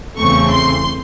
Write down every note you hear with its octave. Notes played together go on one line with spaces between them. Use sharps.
E2 C#3 E3 A3 C4 C#6
C6